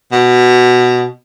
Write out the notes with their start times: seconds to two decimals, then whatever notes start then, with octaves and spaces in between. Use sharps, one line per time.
0.12 B2